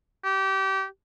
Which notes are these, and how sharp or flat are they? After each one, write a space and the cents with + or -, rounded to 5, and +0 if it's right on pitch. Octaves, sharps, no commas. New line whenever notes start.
G4 -25